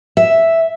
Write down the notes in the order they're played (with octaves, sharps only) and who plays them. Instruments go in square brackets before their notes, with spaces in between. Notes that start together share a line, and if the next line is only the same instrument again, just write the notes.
[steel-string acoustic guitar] E5